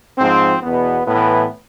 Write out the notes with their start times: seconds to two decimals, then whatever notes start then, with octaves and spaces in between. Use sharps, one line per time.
0.18 G#2 F3 C4
0.63 E2 B2 B3
1.07 A2 B3
1.12 E3